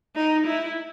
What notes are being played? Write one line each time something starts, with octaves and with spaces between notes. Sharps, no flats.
D#4
E4